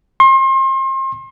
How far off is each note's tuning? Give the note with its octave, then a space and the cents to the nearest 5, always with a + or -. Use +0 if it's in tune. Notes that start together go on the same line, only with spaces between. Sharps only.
C6 +35